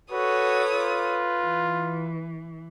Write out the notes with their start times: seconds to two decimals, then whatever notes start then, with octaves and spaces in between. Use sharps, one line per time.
0.12 F#4 A4 B4 C#5 D#6
0.72 F4
1.41 E3